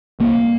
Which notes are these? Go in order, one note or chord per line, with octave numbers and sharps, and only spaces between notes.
C2 A#3